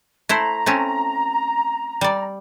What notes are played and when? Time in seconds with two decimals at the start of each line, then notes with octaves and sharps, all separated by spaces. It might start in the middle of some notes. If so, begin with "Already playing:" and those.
0.29 A3 E4 C5 A#5
0.66 A3 C4 C#4
2.01 G3 D5